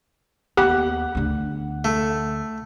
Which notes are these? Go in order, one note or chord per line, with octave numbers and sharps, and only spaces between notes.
D#2 B3 G4 F#5
D2 D3
A3